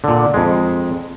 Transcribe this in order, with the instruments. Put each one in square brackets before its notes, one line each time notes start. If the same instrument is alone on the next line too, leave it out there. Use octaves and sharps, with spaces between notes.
[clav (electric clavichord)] A#2 D3
F2 G#3